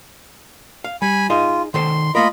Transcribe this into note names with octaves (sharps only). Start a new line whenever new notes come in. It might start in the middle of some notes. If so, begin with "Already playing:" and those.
F5
G3 G#5 B5
D#4 F4 G#4 D#5
D#3 A4 C5 C6
A3 A#3 F4 A#4 D#5 B5